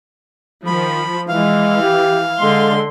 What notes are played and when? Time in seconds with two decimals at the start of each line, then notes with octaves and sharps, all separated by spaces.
0.66 D#3 F3 B5
1.28 E3 G#3 F5
1.82 G4
2.40 D3 G#3 C6